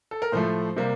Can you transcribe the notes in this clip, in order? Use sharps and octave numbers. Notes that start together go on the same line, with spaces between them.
A4
A#4
A2 F3 A3 C5
C3 G3 A#3